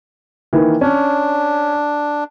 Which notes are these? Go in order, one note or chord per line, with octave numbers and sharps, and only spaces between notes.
D#3 E3 A#3
C#4 D4